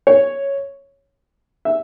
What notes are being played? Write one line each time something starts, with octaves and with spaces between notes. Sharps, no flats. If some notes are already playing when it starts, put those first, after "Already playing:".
C#5
E5